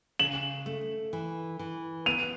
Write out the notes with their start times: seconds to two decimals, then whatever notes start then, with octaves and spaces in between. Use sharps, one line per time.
0.19 C#3 E7 F#7
0.66 A3
1.13 E3
1.59 E3
2.06 B3 D#7 F7